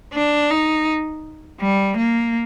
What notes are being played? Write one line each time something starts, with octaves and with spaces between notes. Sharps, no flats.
D4
D#4
G3
A#3